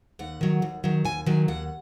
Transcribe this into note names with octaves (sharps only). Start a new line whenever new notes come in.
D#2 F#5
D#3 F#3
D#2
D#3 F#3
D#2 G#5
D#3 F#3 G#5
D#2 F#5